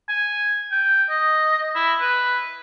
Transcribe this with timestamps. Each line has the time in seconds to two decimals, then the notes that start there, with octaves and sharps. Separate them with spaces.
0.09 G#5
0.72 G5
1.09 D#5
1.75 E4
2.00 B4